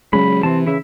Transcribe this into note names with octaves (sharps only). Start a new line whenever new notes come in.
C#3 F#3 G#3 B5
C3 E3 C4 A5
C#3 E4 E5